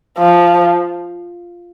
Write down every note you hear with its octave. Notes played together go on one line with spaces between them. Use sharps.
F3